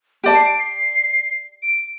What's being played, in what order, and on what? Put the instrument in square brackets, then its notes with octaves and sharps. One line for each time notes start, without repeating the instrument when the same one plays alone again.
[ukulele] G4 D5 A5 [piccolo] D7
[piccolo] C7
D7
C7
D7